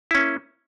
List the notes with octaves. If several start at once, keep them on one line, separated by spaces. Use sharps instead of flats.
A#3 C#4 E4